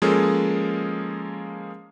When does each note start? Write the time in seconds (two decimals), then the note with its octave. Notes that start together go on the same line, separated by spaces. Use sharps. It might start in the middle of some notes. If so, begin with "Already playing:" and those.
0.02 F3 G#3 A#3 C#4 G#4 A4